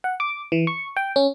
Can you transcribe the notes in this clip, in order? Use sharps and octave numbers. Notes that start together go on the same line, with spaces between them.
F#5
D6
E3
C#6
G5
C#4